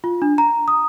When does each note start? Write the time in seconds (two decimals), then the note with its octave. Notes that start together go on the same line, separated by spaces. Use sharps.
0.04 F4
0.22 D4
0.38 A#5
0.68 D#6